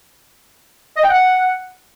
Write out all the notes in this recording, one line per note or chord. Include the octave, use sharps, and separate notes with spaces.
D#5
G5
F#5